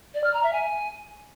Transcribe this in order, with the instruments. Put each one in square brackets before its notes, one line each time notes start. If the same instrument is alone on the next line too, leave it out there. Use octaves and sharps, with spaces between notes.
[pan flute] D5
F6
A#5
E5
G#5